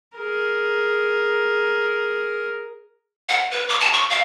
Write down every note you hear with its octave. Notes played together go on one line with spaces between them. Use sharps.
G#4 A#4
F#5
B4
D6
A5
C#6
F5